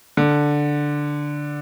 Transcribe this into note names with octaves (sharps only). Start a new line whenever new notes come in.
D3